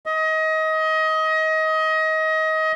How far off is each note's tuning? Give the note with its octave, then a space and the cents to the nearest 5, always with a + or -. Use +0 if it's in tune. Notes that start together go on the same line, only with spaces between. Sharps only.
D#5 +25